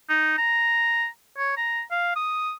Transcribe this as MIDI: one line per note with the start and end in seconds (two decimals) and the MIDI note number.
0.09 0.33 63
0.38 1.06 82
1.38 1.52 73
1.57 1.82 82
1.91 2.15 77
2.16 2.53 87